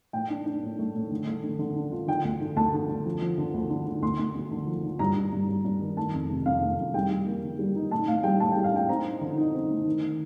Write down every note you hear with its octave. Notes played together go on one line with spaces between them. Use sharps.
A2 G5
D4
D4
A2
A3
A2
D3
A3
D3
D3
D4
F4
D3 G5
D2
D3
D2 A5
D3
D3
F3
F3
D3
D2
D3
D3
D2 C6
D2
D2
D3
F3
D3
G2 A#5
G2
G2
G2
G2
D#3
A3 A5
F2
C3
F2 F5
A3
F2
G3 G5
G3
A#3
D3
G3
D#4
A2 A5
A2 F5
G3 G5
A2 A5
G3 G5
F5
D4 G5
C4 A#5
D#4
D3
D#4
C4
A3
D#3